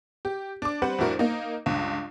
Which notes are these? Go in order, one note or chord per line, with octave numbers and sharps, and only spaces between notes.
G4
D4 D6
G3 C4 B4 C5 F#5
F2 A2 D4 E4 F#4 A#4
A#3 D#4
C#2 G2